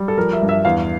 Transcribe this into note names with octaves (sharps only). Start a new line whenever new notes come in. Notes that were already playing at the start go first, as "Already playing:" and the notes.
Already playing: G3
A4
F3 A#4
E5
G2
E5
E2 F5